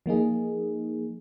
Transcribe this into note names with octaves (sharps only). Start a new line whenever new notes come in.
F3 A#3 D#4 G#4